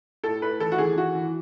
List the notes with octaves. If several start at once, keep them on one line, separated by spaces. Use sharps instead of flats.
A2 A4
A2 B4
E3 A4
F#4
E3 G#4
E3 F#4
E3